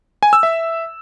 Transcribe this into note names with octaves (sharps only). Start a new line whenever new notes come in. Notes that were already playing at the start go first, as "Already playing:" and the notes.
G#5
E6
E5